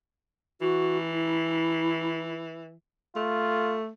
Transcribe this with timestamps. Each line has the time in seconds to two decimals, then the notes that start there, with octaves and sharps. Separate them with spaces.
0.61 E3 F#4
1.12 E4
3.16 A3 F4